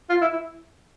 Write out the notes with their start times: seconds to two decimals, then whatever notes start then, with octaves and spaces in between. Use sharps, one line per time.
0.09 F4
0.21 E4
0.33 E4